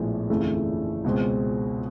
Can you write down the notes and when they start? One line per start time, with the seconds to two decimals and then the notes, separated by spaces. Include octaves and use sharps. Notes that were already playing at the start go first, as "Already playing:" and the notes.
Already playing: A#1 A2 F3 G#3 B3
0.29 G1 F2 C#3 E3 A3
1.04 C#2 B2 G#3 C4